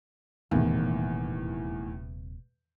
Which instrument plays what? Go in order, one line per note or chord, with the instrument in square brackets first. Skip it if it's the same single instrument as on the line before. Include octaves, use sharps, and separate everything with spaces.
[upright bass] D#1 C3 [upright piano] E2 A2 D#3